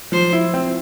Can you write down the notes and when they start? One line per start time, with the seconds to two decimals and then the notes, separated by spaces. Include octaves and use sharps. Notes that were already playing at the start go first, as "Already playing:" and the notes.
0.12 F3 C5
0.33 E4
0.54 C4